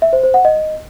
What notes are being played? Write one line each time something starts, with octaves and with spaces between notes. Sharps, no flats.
E5
C5
C5
F#5
D#5